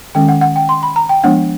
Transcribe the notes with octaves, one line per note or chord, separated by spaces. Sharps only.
D#3 G#3 C#4 G5
F#5
F#5
G5
C6
B5
A#5
G5
F3 G#3 B3 D4 F#5